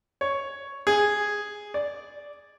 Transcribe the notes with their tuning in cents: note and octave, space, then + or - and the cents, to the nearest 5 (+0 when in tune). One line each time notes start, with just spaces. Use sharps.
C#5 +0
G#4 -5
D5 -10